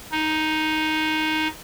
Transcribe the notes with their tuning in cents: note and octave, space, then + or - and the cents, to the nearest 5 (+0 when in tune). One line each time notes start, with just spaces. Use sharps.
D#4 +5